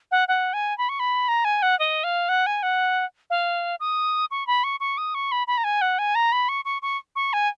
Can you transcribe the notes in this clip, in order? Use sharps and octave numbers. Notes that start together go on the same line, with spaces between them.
F#5
F#5
G#5
B5
C#6
B5
A#5
G#5
F#5
D#5
F5
F#5
G#5
F#5
F5
D#6
C#6
B5
C#6
C#6
D#6
C#6
B5
B5
A#5
G#5
F#5
G#5
A#5
B5
C#6
C#6
C#6
C#6
G#5